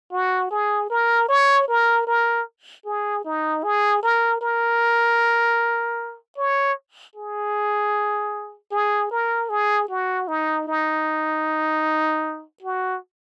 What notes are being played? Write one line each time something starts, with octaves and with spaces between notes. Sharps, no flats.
F#4
G#4
A#4
C#5
A#4
A#4
G#4
D#4
G#4
A#4
A#4
C#5
G#4
G#4
A#4
G#4
F#4
D#4
D#4
F#4